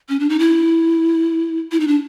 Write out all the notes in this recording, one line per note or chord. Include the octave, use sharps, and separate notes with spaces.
C#4
D4
D#4
E4
E4
D#4
D4